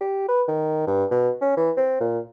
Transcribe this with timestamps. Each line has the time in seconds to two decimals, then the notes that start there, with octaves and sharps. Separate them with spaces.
0.01 G4
0.29 B4
0.48 D#3
0.87 G2
1.11 B2
1.41 C#4
1.57 E3
1.77 C4
2.00 A#2